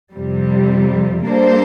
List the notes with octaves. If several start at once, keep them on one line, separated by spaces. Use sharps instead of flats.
F2 C3 G3
G3 A#3 D4 A4 C5